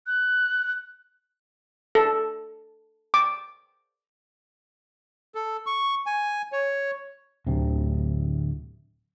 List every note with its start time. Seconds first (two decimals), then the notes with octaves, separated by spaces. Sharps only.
0.07 F#6
1.95 A4
3.14 D6
5.35 A4
5.66 C#6
6.06 G#5
6.52 C#5
7.47 D1 D2 C3